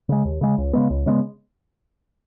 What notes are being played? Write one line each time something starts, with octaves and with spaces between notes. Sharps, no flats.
C#3 G#3
D#2
C#3 G#3
C#2
C#3 G#3 B3
C#2
C#3 G#3 B3